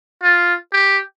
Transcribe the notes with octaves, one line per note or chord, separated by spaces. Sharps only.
F4
G4